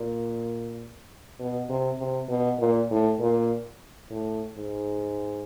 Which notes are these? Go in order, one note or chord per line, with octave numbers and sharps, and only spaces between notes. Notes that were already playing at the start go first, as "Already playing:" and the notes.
Already playing: A#2
B2
C3
C3
B2
A#2
A2
A#2
A2
G#2